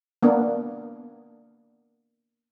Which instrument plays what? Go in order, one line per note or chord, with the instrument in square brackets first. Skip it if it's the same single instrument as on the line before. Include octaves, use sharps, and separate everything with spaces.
[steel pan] A#3 B3 D4